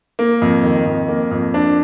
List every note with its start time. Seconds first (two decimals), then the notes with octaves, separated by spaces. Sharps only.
0.19 A#3
0.42 F2
0.63 D#3
0.86 F2
1.08 A#3
1.31 F2
1.54 D4